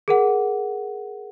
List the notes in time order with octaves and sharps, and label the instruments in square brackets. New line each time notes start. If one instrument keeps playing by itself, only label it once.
[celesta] G#4 A#4 F#5